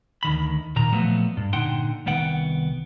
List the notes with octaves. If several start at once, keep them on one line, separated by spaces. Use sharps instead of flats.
D2 D#3 B5
A#2 D#3 A#5
A#2 F3 F#3 A3 B3
G2
A#2 D3 D#4 F#5 G5 C6
C2 D#3 B3 F#5 G5